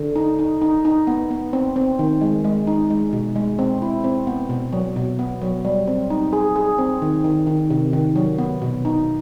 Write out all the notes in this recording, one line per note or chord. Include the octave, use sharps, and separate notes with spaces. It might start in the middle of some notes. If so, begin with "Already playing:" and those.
Already playing: D3
D#4
D#4
D#4
D#4
B3
B3
C4
C4
D#3
G#3
G#3
D#4
G#3
B2
G#3
C4
E4
C4
B3
B2
F#3
B2
B3
F#3
G3
C4
D#4
G#4
G#4
C4
D#3
D#3
D#3
C3
D#3
F#3
B3
B2
D#4